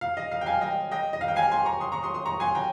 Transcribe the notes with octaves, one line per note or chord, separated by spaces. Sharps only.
F5
D#5
F5
G5
F5 G#5
D#5 G5
D#5 G5
D#5
F5
G5
F5 G#5
G#5 C6
A#5 C#6
C6 D#6
A#5 C#6
C6 D#6
C6 D#6
A#5 C#6
G#5 C6
G5 A#5